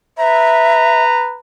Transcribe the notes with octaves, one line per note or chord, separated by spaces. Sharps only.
B4 E5 A#5